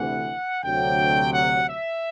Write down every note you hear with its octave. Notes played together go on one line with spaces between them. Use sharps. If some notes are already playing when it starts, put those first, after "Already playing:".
Already playing: D2 C3 E3 F#5
D2 C3 F#3 G5
F#5
E5